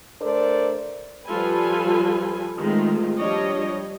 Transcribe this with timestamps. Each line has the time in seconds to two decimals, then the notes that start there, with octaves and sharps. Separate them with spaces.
0.22 A3 D4 A4 A#4 C5 D5
1.28 F3 G3 F4 A4 B4 G#5
2.59 D#3 G#3 A3 C4 F4
3.17 F3 G3 D4 C#5 D#5